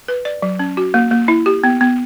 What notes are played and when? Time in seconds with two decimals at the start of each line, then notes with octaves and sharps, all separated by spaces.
0.08 B4
0.25 D5
0.42 F#3
0.59 C#4
0.77 F#4
0.94 A#3
1.11 A#3
1.28 E4
1.46 G4
1.64 B3
1.81 B3